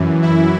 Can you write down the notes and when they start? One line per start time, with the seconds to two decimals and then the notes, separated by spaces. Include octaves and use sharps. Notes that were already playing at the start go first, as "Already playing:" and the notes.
Already playing: F#2 E3
0.22 E4